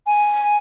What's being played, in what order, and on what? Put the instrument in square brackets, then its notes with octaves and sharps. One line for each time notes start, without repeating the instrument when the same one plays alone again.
[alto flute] G#5